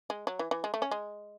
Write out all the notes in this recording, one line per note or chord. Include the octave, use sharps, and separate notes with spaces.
G#3
F#3
E3
E3
G#3
A3
C#4
G#3